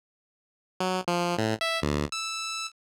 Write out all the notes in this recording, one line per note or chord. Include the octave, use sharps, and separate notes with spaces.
F#3
F3
A2
E5
D2
E6